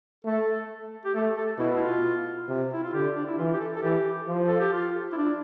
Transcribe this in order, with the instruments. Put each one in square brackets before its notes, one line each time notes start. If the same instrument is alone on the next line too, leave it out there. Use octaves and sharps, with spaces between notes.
[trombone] A3 [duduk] A4
[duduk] G4
[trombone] A3 [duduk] A4
[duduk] A4
[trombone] B2 [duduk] E4
[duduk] E4
F4
[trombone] C3
[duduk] E4
F4
[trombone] D3 [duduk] G4
[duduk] D4
E4
[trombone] E3 [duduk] F4
[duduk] G4
A4
A4
[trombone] E3 [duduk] G4
[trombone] F3
[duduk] A4
G4
F4
E4
D4